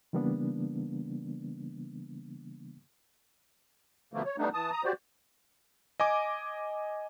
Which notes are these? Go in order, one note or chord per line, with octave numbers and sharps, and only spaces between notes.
C#3 E3 G3 A#3 B3 D4
B2 D3 F3 A3 A#3
C#5
G3 A3 B3 D4 D#4
E3 A5 D#6
A#5 D#6
F#4 G4 C5 D5
D#5 G#5 D6